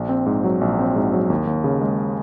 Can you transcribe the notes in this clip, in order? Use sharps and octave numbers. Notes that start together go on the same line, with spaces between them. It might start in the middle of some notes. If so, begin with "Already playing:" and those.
Already playing: A#1
C4
G#2
F#3
A#1
C4
G#2
F#3
D#2
D#2
C#3
G#3